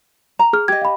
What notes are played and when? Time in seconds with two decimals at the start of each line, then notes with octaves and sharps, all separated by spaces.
0.39 A#5
0.53 G#4 F6
0.68 G4 D#5 G#6
0.82 F5 B5